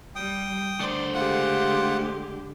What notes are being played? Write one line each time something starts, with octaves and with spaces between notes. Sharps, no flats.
G3 G5 D#6
D3 A3 C5 D5
G#3 F4 G4 F#5